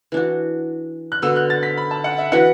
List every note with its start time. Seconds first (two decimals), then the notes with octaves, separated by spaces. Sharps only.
0.12 E3 D4 F#4
1.12 F#6
1.22 D3 B3 F#4 E6
1.36 F#6
1.50 A6
1.63 B6
1.77 B5
1.91 A5
2.04 F#5
2.18 E5
2.32 E3 D4 F#4 B4 F#5